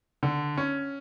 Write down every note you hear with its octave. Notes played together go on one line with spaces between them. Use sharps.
D3
C#4